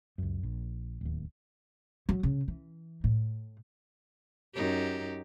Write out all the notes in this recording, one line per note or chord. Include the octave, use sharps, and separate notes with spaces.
C#2 F#2
A#1
D1 D#2
F#3
C#3
E3
A2
F#2 D#4 G4